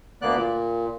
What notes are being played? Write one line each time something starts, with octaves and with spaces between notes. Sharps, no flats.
D2 A#3 B3 D5 F#6
A#2